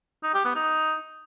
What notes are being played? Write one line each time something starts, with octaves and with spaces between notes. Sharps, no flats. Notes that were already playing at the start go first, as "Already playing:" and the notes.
D#4
G4
B3
D#4